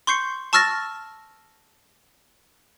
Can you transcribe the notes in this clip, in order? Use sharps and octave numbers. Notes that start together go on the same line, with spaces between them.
C6 C#6 G6 C7 C#7
A5 C#6 E6 F6 A6 A#6